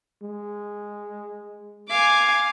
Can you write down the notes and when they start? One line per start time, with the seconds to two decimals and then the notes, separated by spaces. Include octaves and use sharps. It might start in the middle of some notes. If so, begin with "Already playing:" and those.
0.22 G#3
1.89 F5 G#5 D6